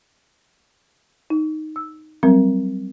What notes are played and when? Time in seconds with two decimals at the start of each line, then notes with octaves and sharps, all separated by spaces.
1.30 D#4
1.76 E6
2.23 F#3 G3 C4 A#4